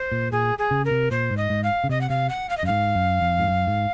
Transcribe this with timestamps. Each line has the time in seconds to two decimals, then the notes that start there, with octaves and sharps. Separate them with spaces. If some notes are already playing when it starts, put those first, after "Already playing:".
Already playing: C5
0.12 A#2
0.32 A#2 G#4
0.58 G#4
0.71 C#3
0.85 A#4
0.91 C3
1.11 A#2 C5
1.31 G#2
1.37 D#5
1.50 G#2
1.63 F5
1.84 C#3
1.89 C3 D#5
2.01 F#5
2.09 C3 F5
2.29 F#5
2.49 F5
2.57 D#5
2.63 F#2
2.66 G#2 F5
2.95 F#2
3.21 F2
3.39 G#2
3.48 F#2
3.67 G#2